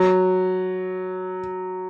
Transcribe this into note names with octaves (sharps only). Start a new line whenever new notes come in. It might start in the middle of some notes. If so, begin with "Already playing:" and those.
Already playing: F#3